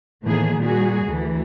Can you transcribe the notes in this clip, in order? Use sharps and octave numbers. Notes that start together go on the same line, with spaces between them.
A2 D#3 E3 A#3 B3 G#4
A#2 G3 F#4 G#4
D2 E3